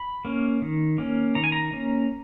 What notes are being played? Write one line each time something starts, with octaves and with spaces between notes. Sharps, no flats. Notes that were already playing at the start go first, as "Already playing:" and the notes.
Already playing: B5
A#3 C#4
D#3
A#3 C#4
D#3 A#5
G#5
A#5
A#3 C#4